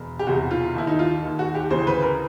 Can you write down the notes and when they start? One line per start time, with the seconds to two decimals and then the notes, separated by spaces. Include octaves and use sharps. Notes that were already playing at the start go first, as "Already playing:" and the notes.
Already playing: E1
0.19 G4
0.27 E1 E2 C3 F#4
0.51 F4
0.75 D#2 D#3 E4
0.87 D#4
0.99 F4
1.23 D#2 D#3
1.39 F#4
1.55 G4
1.70 D2 C#3 E3 C5
1.87 B4
2.03 A#4